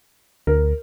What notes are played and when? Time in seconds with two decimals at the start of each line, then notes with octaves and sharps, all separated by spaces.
0.47 D2 A#4